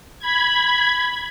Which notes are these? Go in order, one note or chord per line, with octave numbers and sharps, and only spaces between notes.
B5 G#6